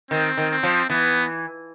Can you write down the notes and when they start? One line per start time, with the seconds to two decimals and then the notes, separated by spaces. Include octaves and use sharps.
0.11 D#3 C4
0.37 D#3
0.51 C4
0.63 F3
0.90 E3 B3